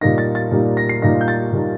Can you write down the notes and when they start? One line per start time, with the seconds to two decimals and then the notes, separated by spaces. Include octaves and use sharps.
0.01 A#2 G3 A#3 D#4 A#6
0.18 A6
0.35 A6
0.51 A#2 G3 A#3 D#4
0.77 A#6
0.89 C7
1.02 A#2 G3 A#3 D#4 A#6
1.21 G6
1.28 A6
1.53 A#2 G3 A#3 D#4